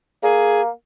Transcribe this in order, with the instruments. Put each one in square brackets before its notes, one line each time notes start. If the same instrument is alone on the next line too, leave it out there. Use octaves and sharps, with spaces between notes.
[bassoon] A#3 [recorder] G#4